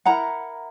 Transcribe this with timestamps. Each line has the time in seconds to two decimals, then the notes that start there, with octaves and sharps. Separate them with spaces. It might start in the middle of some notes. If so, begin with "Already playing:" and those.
0.05 E4 A#4 F#5 A#5